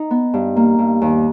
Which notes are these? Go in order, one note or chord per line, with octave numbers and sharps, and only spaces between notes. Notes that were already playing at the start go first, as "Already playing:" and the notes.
Already playing: D#4
B3
G2
A#3
G2
D#2